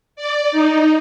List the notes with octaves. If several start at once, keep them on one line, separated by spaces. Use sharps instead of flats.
D5
D#4